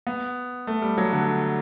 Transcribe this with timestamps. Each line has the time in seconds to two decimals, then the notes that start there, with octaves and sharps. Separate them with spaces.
0.07 B3
0.67 A3
0.82 G3
0.98 F#3
1.13 D3